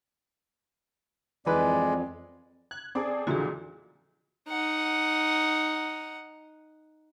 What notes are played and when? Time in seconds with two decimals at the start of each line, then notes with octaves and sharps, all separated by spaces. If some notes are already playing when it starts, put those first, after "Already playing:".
1.46 F2 E3 G#3 B4 D5
2.71 F#6 G#6
2.95 C4 G#4 A4 D5
3.27 F2 A#2 D3 E3 F#4 G#4
4.48 D#4 F#5